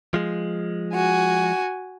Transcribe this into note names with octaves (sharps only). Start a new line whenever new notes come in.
F3 G#3
F#4 G#5